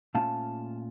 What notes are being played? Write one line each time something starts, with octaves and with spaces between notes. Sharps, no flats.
A#2 A3 C#4 F4 F5 A5